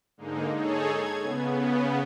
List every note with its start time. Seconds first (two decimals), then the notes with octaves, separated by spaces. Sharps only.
0.17 G#2 D3 G#3 A#3 D#4
0.53 D#4 G#4 A4 C#5
0.89 G#6
1.20 C#3 B3